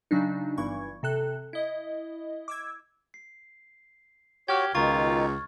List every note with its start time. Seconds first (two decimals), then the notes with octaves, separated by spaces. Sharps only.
0.11 C#3 F#3 D4 D#4
0.57 G1 G2 E3 C#6 G#6
1.03 C3 A4 F#6
1.53 E4 D#5
2.48 D6 E6 G#6
3.14 C7
4.48 F#4 G4 C#5 F6 G#6
4.75 C#2 B2 D#3 D#4 F4 C#6 A6